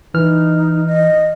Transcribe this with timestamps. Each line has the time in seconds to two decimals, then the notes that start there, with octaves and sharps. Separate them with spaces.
0.14 E3 D#4 F6
0.87 D#5